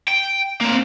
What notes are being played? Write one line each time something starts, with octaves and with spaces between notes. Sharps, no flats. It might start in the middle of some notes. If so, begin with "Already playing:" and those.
G5
A#3 C4